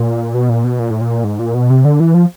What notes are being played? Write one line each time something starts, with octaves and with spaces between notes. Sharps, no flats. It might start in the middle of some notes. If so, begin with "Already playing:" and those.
Already playing: A#2
B2
A#2
B2
A#2
A2
A#2
G#2
A#2
B2
C3
D3
E3
F3